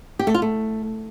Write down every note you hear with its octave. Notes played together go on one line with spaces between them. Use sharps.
G4
A3
F4
A3